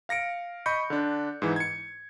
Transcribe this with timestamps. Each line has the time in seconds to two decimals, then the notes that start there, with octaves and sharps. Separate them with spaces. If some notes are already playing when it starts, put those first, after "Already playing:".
0.09 F5 A#6 C#7 D7
0.66 D#5 B5 C#6 G6 C#7
0.90 D3 D4
1.42 G#2 E3
1.56 G#6 C#7